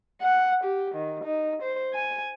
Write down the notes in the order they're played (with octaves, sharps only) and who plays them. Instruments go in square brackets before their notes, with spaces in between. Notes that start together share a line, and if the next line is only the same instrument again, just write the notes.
[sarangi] F#5
G4
D#3
D#4
C5
G#5